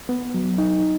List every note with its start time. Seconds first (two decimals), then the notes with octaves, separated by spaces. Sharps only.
0.09 B3
0.34 F#3
0.58 D#4